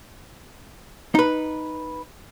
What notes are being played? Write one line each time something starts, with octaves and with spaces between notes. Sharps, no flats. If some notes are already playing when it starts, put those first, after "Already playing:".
D#4 B4